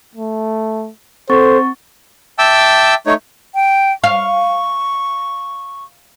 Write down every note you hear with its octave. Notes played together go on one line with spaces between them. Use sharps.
A3
C4 A4 C5 C#6 A6
E5 G5 A5 D6 E6
A3 D#4 C#5
G5
F5 C#6